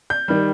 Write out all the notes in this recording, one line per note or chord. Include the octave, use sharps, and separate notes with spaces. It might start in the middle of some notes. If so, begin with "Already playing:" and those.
G6
D#3 G3